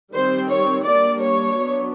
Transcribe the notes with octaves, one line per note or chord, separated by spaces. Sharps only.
D#3 G3 C4 C5
C#5
G3 A#3 D4 D5
C#5
F#3 B3 D4